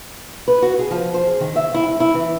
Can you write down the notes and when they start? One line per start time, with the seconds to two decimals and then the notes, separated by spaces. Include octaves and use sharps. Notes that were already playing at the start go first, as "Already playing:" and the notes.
0.48 B4
0.62 F#4
0.79 G#4
0.91 F3
1.14 C5
1.27 G#4
1.40 D#3
1.56 E5
1.74 E4
1.86 G2
2.00 E4
2.14 E3